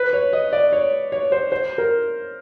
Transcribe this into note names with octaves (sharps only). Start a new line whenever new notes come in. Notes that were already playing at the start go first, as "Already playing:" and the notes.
Already playing: B4
C#5
D#5
D5
C#5
C#5
C5
C5
A#4